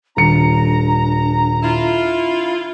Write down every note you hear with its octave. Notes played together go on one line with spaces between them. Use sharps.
D#1 D4 A#5 C#7
E4 F4